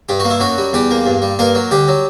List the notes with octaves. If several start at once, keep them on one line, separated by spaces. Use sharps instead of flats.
G2 G4
F#4
A#3
E4
F#2 F#3 F#4
G3
E2 G3 G4
A#3
G2
G3
G2 A#3 A#4
F#3
D2 G3 G4
F#3